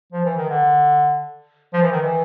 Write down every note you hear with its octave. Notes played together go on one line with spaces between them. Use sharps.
F3
E3
D#3
D3
F3
E3
D#3
E3